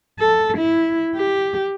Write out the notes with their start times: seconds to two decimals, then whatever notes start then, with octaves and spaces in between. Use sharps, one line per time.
0.19 A4
0.57 E4
1.16 G4